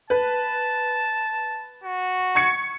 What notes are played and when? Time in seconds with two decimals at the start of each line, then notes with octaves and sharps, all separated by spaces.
0.10 B4 A5
1.84 F#4
2.35 C#6 G#6 C#7